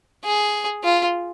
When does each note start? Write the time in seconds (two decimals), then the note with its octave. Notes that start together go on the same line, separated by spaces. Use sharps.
0.25 G#4
0.84 F4